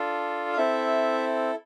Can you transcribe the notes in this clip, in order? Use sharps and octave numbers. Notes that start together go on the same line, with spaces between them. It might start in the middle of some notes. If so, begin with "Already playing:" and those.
Already playing: D4 F4 A4
F5
C4 E4 A4 E5